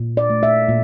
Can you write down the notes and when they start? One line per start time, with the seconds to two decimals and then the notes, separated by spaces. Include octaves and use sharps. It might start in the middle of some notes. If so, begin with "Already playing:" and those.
Already playing: A#2
0.17 D5
0.30 A3
0.43 E5
0.69 A#2